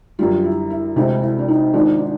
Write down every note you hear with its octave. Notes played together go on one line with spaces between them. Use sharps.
F#2 D3 G3 F4
E4
E4
D2 C3 E3 G#3 C4 E4
E4
D4
D#4
G#1 G#2 F3 G#3 D4
D4